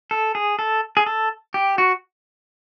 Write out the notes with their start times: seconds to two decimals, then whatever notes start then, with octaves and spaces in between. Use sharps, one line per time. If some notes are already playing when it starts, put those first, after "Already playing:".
0.11 A4
0.35 G#4
0.59 A4
0.97 G#4
1.06 A4
1.54 G4
1.78 F#4